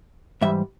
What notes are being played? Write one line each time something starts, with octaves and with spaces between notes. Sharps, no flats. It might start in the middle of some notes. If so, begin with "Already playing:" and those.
G#2 E3 G3 E5